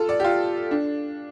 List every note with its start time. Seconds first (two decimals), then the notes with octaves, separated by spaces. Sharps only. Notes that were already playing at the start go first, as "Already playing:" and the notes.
Already playing: F4 A4
0.09 D5
0.20 G4
0.24 F4
0.71 D4